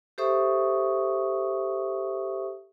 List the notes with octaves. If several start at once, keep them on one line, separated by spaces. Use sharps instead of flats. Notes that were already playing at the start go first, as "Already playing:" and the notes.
G4 A4 C5 E5 C#6 D#6